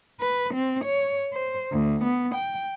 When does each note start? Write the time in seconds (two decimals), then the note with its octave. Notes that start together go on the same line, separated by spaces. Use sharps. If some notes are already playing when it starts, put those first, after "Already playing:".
0.20 B4
0.54 C4
0.85 C#5
1.33 C5
1.72 D2
2.03 B3
2.34 G5